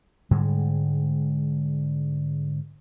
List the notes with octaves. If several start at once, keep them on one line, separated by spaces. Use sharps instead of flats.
G#2 D3 G3 G#3